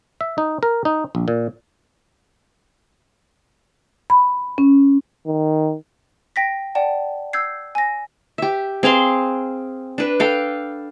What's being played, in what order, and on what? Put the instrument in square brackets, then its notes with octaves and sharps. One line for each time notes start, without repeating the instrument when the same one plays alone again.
[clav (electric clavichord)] E5
D#4
A#4
D#4
A#1
A#2
[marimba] B5
C#4
[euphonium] D#3
[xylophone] G5 A#6 B6
D5 F#5 G5 A5
E6 G6 G#6 C7
G#5 A#6
[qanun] G4 E5
C4 G#4 F5 C6
D4 B4
A4 F5 G5